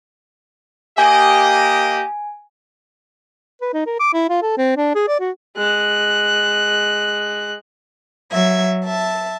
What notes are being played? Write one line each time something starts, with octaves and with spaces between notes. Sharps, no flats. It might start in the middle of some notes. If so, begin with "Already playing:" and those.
A#3 G4 D#5 G#5
B4
D#4
A#4
D6
E4
F4
A4
C4
D4
G#4
D5
F#4
G#3 F#6
F#3 E5 G#6
E5 A5